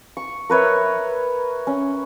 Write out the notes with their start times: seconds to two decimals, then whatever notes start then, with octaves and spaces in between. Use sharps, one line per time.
0.17 C#6
0.50 A#4 B4 C#5 E5
1.67 C#4